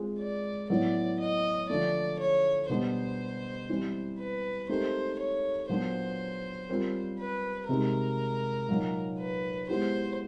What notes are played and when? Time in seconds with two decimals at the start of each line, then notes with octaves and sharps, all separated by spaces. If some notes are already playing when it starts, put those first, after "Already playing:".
Already playing: G#3 C4 F4 G#4
0.19 D5
0.70 A2 F#3 B3 E4 D5
1.19 D#5
1.69 D3 F3 A3 D5
2.19 C#5
2.69 B2 G3 B3 D4 C5
3.69 E3 G3 C4
4.19 B4
4.69 A3 C4 D#4 G4 A#4 C5
5.20 C#5
5.69 A#2 F#3 B3 D4 F#4 C5
6.69 G3 C4 F4 A#4
7.19 B4
7.69 C3 D#3 G#3 A#4
8.69 A#2 F#3 A#3 D#4
9.19 B4
9.69 G#3 B3 E4 G4 C5